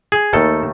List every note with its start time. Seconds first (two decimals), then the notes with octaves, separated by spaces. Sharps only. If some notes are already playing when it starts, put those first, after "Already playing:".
0.12 G#4
0.33 D#2 D#3 A3 A4